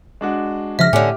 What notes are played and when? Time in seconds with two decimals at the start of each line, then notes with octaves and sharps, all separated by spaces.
0.21 G#3 D4 F#4
0.79 C#3 F3 E5 F6 A#6
0.93 A2 D3 C#4 G4